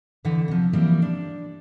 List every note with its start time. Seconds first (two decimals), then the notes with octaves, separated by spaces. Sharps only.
0.25 E2 D3 E3 F#5
0.48 C3 F3
0.73 E3 F3 G3 A#3 C4 E4
1.02 D4